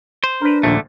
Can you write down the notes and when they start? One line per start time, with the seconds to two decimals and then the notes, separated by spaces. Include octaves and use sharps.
0.24 C5
0.41 D4 A#4 B4
0.63 A#1 D#2 A#2 D3 A3